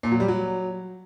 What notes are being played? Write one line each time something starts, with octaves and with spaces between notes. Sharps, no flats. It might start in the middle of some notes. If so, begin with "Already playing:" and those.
A#2
F#3
G3
F#3